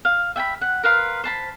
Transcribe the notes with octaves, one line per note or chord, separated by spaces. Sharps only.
F5
E5 G5 G#5 B5
F#5
A#4 B4 F5 C6
C5 A5 B5